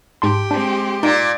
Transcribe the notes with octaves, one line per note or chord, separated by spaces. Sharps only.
G#2 G4 A5 C6
G#3 C4 D4
A#2 D#4 D5